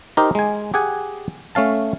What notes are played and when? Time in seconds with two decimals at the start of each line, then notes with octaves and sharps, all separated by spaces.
0.17 D#4 G4 A#4 C5
0.35 G#3 G#5
0.74 G4 G#4 F#5 G#5
1.55 A3 C#4 F5 A5